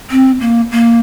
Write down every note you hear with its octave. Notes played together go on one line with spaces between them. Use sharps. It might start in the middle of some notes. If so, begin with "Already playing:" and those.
C4
A#3
A#3